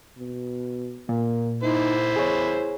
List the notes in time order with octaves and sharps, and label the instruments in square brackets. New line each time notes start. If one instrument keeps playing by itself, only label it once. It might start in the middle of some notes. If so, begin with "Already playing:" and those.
[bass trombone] B2
[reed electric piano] A#2 [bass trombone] A#3
[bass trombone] D#4 [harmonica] E4 C5
[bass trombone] E2 [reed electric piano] G#4 C#5